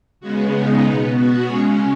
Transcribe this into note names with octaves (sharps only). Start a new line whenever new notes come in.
C#3 G#3 B3 F#4
D#4
B2 B3 D#4
F#4
C#3 G#3 C#4 G#4 C#5